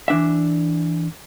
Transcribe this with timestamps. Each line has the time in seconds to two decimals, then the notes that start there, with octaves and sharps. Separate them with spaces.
0.08 E3 D4 E5